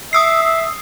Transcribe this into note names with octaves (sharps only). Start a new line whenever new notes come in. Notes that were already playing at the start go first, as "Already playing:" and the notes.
E5 D#6 E6 C7